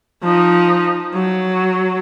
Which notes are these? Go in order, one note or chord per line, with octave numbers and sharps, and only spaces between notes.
F3 D#4
F#3